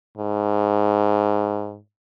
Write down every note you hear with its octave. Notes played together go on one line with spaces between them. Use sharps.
G#2